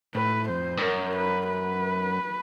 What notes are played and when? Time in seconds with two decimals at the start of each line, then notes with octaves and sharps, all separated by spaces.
0.15 A2 B4
0.48 F2 C5
0.77 G2
0.82 F#2 A#4
1.16 B4
1.50 B4